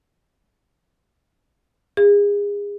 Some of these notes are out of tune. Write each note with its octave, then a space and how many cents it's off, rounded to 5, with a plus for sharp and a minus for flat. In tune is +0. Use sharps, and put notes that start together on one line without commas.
G#4 -30